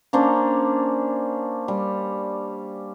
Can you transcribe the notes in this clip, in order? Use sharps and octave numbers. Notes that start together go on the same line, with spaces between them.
A#3 C#4 D4 C5
G3